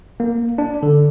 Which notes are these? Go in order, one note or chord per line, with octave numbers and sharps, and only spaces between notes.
A#3
D4
D3